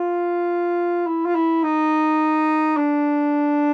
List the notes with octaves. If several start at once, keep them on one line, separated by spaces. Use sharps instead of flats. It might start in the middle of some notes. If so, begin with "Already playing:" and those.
Already playing: F4
E4
F4
E4
D#4
D4